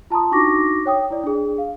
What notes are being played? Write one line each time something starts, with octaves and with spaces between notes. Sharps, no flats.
F4 A5 A#5 C6 D#6
D4 D#4 F#4 C#6 D6 A#6
C#5 G5 D#6
E4 D5
D4 G#4
F5